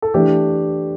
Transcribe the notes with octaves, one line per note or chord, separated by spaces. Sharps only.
A4
E3 A3 D4 G4